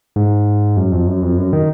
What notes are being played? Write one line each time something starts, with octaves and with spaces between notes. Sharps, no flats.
G#2
F#2
F2
F#2
F2
F#2
D#3